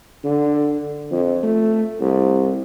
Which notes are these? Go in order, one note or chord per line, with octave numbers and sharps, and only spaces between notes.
D3
F2
A3
C2